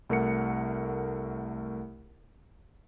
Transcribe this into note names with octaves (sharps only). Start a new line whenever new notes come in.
C2 A3 A#4 F#5 C#7